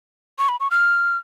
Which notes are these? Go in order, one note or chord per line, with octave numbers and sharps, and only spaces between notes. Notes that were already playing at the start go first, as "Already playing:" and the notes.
C#6
B5
C#6
F6